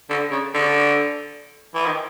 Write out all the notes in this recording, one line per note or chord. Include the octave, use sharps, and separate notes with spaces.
D3
C#3
D3
E3
D#3